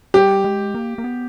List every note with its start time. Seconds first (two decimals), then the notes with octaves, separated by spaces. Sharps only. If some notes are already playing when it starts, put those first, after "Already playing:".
0.14 G3 G4
0.44 G#3
0.75 A#3
0.98 A#3
1.04 B3